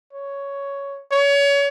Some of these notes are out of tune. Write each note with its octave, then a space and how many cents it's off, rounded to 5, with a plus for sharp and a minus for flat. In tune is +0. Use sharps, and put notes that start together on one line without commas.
C#5 +10
C#5 +30